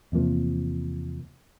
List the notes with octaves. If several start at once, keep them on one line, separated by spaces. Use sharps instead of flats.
E2 C3 F3 A#3